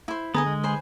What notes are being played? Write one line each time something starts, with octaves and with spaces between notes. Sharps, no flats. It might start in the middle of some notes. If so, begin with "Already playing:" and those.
E4 C5
D3 B3 G#4 D#5 G#5 A#5
G#3
B4 C5 G#5